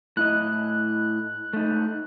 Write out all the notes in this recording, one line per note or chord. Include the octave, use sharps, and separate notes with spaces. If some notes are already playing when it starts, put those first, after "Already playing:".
A2 E4 D#5 F#6
A3 D#4